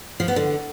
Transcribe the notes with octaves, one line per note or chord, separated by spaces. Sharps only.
F3
B3
D3